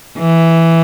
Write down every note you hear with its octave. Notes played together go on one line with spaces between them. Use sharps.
E3